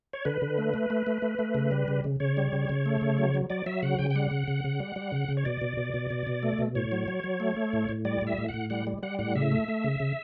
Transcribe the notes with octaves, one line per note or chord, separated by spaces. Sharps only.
C#5
D3 B4
D3
A3
A3
A3
A3
A3
A3
C#3
G3
C#3
C#3
C#3 C#5
G3
C#3
C#3
A3
C#3
F#3
F#3
F#3 D5
F#3 E5
C#3 F#5
C#3 G5
G5
G3 F#5
C#3
C#3
C#3
G3
G3
C#3
C#3
C#5
B2 D5
B2
B2
B2
B2
B2
A3
B2
A2 C#5
F#3
F#3
F#3
A3
A3
A2
A2
G3 D5
A2
E5
A2
F#5
A2
G3 F#5
G3
G3 F#5
A2 F#5
C#3 E5
A3
A3
C#3
C#3